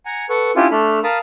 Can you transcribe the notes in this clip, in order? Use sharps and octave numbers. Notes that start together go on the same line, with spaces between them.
F#5 G#5 A#5
A4 B4 F#5 C#6
C#4 D4 E4 F4 G4
A3 D4 A4 B5 F6
A#4 F5 A5 B5 D#6